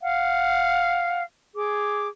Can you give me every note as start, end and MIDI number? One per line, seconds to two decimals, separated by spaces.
0.01 1.22 77
0.01 1.22 78
1.55 2.07 68
1.55 2.07 86